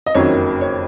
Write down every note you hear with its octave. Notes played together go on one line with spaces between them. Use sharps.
D#5
F#1 F2 D#3 F#3 C#5
C#5